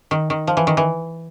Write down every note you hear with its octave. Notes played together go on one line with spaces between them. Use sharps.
D#3
D#3
F3
E3
D#3
E3